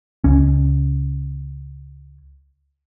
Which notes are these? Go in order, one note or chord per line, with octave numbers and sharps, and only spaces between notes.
C#2 C#4